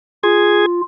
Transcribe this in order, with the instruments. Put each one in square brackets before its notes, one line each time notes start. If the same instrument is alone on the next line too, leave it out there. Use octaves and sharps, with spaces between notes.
[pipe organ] F4 [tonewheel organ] G#4